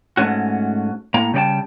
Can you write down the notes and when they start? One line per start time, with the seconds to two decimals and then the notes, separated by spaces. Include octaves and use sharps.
0.17 G#2 D#3 A3 C#4 F#4
1.14 A2 A#3 A#5
1.34 C#3 G3 A4 D5 G5 A5